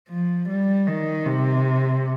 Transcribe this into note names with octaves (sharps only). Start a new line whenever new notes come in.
F3
G3
D#3
C3